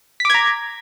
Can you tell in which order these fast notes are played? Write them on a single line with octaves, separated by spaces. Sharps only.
B6 D6 G#6 A#5